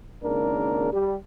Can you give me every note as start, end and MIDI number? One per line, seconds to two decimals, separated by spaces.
0.24 0.93 32
0.24 0.93 44
0.24 0.93 49
0.24 0.93 58
0.24 0.93 62
0.24 0.93 70
0.93 1.16 55